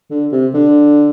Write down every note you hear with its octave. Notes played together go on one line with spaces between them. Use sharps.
D3
C3
D3